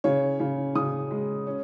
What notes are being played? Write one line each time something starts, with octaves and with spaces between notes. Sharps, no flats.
C#3 C#5
C#3
C#3 D#6
G#3
C#4